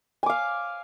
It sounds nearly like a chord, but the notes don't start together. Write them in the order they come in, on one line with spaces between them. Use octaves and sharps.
G#5 D6 F5